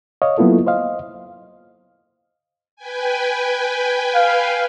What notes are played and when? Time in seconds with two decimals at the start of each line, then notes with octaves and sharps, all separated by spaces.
0.22 C#5 D#5 F5
0.38 F#3 A#3 B3 E4 F4 A4
0.66 C5 D#5 F5
2.76 B4 G5 G#5
4.15 F5